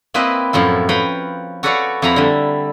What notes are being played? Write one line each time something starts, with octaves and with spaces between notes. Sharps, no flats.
A#3 C4 E4 B4 D#5
F#2 A2 F3 E4
B4 C#5 F5 G5 A#5 B5
F#4 A4 B4 C#5 D5 F5
F2 F3 E4 A#5 B5
D3 G3